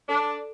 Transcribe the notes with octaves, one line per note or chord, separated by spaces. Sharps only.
D4 A4